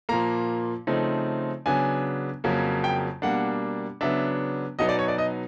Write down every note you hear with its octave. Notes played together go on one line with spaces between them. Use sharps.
A#2 F3 A#3 A#5
C#3 F3 A3 C4 D#4
C#3 F#3 B3 D4 G#5
F2 C#3 F#3 A#3
G5
B2 G3 A#3 D4 F#5
C#3 F#3 B3 D4 E5
B2 F#3 B3 D#4 D#5
D5
C#5
D5
D#5